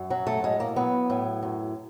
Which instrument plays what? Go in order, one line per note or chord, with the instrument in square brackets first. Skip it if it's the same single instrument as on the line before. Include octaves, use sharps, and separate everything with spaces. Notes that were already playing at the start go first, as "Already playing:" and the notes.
Already playing: [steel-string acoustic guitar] F#2
F#3
A3
A2 G#3
A#3
F#3 B3
A2
F#2